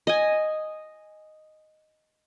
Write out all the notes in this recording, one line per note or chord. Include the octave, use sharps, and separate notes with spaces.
D#5 G#5